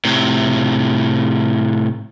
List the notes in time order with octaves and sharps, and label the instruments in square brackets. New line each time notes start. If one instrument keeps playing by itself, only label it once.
[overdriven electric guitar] A2 C3